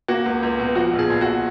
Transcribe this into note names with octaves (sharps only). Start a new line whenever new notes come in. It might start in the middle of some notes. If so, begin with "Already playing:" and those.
A#3 F#4
C#2
C#2
B2
F3 F#4
A#1
G#4
A#1
F#4